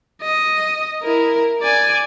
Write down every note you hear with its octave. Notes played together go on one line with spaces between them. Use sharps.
D#5
E4 A#4
D5 G#5